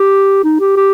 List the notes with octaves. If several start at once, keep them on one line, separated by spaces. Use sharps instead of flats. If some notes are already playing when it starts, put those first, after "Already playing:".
Already playing: G4
D#4
G4
G4